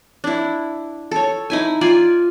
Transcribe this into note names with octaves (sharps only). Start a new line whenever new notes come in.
D4 E4
A4 C#5
D#4 E4 G#5
F4 D5 G#5